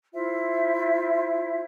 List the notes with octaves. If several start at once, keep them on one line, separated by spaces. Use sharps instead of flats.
E4 F4 C5 E5